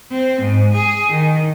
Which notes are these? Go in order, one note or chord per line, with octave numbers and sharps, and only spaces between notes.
C4
G#2
G#4
D#3